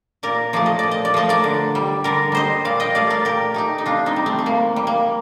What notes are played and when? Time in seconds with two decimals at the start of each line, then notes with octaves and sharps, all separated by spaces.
0.23 A#2 A#4 D5
0.53 F3 A3 D5
0.66 D#5
0.79 A#2 D5
0.91 D#5
1.05 D5
1.14 F3 A3 D#5
1.29 A#4 D5
1.44 D3
1.75 G3
2.04 D3 A#4 D5
2.32 G3 C5 D#5
2.65 A#2 D5 F5
2.80 D#5 G5
2.95 A3 D5 F5
3.10 A#4 D5
3.25 A#2 G4 A#4
3.54 A3 D#4 G4
3.78 D#4
3.86 C3 D4 F4
4.06 C4 D#4
4.16 G3
4.26 A3 C4
4.39 A3
4.46 C3 A#3
4.76 G3
4.87 A#3